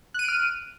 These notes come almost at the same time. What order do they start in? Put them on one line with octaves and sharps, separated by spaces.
F#6 D#7 D7 F6